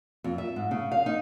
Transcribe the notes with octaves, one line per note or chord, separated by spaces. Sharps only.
F2
E5
G#2
C#3
F5
D#4